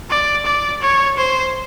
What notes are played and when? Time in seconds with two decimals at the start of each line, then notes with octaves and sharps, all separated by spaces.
0.10 D5
0.45 D5
0.82 C#5
1.18 C5